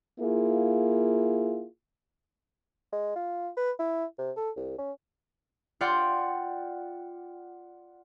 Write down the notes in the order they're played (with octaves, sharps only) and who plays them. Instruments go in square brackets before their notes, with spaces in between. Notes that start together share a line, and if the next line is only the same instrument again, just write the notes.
[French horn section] A#3 E4 F4 G#4
[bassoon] G#3
F4
B4
E4
C3
A4
C2
C#4
[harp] F4 D5 F#5 G5 C6